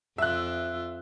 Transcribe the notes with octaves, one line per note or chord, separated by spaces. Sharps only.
F2 F4 E5 E6 F#6